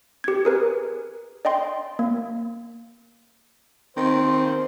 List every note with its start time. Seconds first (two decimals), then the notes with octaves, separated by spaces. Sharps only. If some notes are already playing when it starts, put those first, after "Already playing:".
0.24 G4 G#6
0.45 G#4 A#4 B4
1.45 D5 D#5 G5 C6
1.99 A#3
3.97 D#3 C4 C5